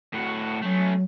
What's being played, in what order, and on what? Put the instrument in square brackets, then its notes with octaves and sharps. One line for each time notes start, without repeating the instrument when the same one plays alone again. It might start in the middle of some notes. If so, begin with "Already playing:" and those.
[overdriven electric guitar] A2 F#4
[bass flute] F#3 [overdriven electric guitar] A3 C#4